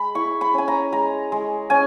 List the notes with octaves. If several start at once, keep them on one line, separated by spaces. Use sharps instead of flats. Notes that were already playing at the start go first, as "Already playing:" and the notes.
Already playing: G#3 B5
E4 C#6
B5
C#4 G#5
A#5
G#3 A#5
G#3
C#4 G#5